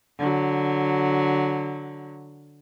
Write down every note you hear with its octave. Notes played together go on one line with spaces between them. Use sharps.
D3 F#3